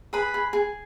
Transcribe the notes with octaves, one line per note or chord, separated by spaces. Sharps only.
G#4 B4 B5
G#4
G#4